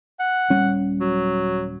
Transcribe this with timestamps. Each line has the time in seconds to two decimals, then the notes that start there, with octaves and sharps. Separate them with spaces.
0.20 F#5
0.50 D#1 G3 C#4
1.00 F#3